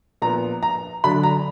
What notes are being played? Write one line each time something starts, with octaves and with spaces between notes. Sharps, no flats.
A#2 F3 B3 A#5
A#5
D3 F#3 D4 B5
A#5